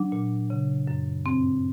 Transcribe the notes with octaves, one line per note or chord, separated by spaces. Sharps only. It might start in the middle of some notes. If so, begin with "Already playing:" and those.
Already playing: F#3 D4
A#2
C#3
F#2
G2 C4